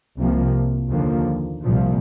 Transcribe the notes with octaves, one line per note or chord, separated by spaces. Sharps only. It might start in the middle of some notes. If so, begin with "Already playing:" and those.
C2 C3 F3 A#3
D#2 D3 F3 A#3
C2 A#2 F3